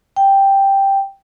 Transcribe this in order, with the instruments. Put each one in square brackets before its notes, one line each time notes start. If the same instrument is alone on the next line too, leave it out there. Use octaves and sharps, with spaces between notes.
[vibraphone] G5